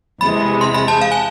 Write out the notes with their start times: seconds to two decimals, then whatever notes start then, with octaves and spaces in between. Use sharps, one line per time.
0.21 E2 C3 G#3 B5
0.61 C6
0.74 B5
0.88 A5
1.01 F5
1.12 G#5